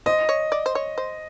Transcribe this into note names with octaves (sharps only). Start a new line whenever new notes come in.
C5 D#5
C#5
D5
C5
C#5
C5